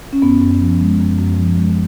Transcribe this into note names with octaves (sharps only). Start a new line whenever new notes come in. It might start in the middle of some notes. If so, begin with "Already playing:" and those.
C#4
F#2 B3
F#2
F3
G#3
F#2
F#2
F3
G#3